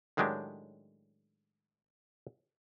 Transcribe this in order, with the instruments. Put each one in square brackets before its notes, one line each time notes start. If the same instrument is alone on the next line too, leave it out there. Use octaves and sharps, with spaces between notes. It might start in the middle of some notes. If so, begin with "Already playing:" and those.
[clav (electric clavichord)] A2 D#3 F#3 G#3 D4 G4